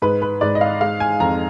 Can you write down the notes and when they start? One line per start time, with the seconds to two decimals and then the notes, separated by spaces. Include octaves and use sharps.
0.02 G#2 B4
0.22 B4
0.41 G#2 D5
0.55 D#5
0.61 F5
0.81 G#3 F5
1.00 G#5
1.20 F2 A#5